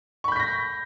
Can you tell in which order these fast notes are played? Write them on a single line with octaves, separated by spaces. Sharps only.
C#6 B5 G6 B6 A#6